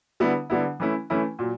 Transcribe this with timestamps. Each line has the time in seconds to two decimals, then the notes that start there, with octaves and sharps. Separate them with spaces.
0.20 D3 G3 B3 E4
0.50 D3 G3 B3 E4
0.80 E3 A3 C#4 E4
1.10 E3 A3 C#4 E4
1.39 A#2 F#3